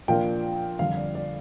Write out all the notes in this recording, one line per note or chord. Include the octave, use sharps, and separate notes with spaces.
A#2 F3 A#3 D4 G5
F2 D3 G3 F5
D5
D5